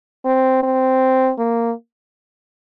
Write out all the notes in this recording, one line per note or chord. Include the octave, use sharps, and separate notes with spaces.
C4
C4
A#3